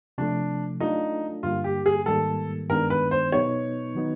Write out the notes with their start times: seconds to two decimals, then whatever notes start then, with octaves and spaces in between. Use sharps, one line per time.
0.18 C3 F3 A3 D4
0.80 F#3 A3 D4 D#4 F4 A4
1.43 G2 D3 G3 A#3 F4
1.64 G4
1.86 G#4
2.06 G#2 D#3 G3 A#3 A4
2.70 G2 D#3 G#3 B3 D4 A#4
2.90 B4
3.11 C5
3.32 B2 F#3 B3 D#4 C#5
3.95 D#3 F#3 B3 D#4